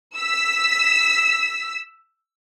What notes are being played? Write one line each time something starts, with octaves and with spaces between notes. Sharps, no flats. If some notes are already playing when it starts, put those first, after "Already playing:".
E6 B6